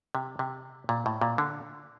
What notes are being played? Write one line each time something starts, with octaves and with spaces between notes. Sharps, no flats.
C3
C3
A#2
A2
A#2
D3